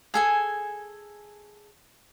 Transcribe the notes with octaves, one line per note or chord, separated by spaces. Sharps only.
G#4 A4 G#5